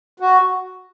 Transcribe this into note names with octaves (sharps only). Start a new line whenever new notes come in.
F#4